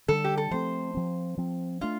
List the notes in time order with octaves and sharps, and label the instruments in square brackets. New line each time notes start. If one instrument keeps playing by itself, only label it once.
[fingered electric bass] D3 G3 D4 [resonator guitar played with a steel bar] A4
[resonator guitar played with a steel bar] G4
A4
[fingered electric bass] F3 A3 C4 [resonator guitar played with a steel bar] C5
[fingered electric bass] F3 C4
F3 C4
[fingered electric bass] A3 D4 [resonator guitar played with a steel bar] F4